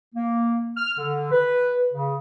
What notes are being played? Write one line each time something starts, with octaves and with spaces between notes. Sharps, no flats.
A#3
F6
D3
B4
C#3